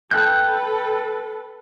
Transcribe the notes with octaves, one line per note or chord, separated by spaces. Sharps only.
A4 B4 G5 F#6 G6